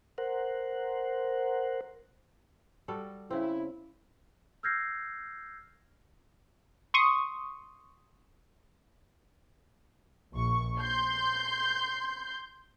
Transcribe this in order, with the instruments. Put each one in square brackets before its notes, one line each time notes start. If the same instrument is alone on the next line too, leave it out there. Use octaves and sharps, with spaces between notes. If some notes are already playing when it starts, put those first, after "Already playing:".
[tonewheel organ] A#4 C5 F#5
[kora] G3 F#4 A4
[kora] C#3 C4 [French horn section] E4
[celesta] E6 F6 G6 G#6 A#6 C7
[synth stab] C6 C#6 D#6
[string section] A#1 C#6
C6 G6